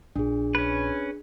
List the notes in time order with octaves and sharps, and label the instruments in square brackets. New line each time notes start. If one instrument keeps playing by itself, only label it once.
[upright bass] A#1 [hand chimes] D4 G#4
[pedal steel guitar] C#4 B4